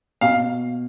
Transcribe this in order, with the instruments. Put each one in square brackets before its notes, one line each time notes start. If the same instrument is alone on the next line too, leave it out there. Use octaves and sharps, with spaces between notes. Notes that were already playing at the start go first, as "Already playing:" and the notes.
[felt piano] B2 [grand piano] F5